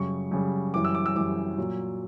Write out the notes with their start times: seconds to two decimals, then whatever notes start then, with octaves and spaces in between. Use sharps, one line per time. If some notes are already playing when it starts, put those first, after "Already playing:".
Already playing: F#2 C#3 G3 C#6
0.31 F#2 C#3 G3
0.74 F#2 E3 G3 D6
0.85 E6
0.95 D6
1.06 E6
1.16 F#2 E3 G3 D6
1.58 A#2 F#3